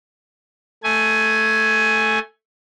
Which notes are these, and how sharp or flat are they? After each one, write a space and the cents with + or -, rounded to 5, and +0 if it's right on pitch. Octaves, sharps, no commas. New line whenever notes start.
A3 +0 G#5 +10